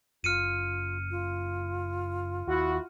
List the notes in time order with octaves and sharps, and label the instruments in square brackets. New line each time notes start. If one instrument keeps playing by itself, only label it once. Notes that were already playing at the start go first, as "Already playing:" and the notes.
[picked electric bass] F#1 [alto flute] F4 [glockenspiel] F6 C#7 D#7
[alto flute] F4
[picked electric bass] D#2 [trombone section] E4 F#4